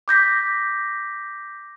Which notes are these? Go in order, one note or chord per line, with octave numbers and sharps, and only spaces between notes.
D6 G6 A#6 B6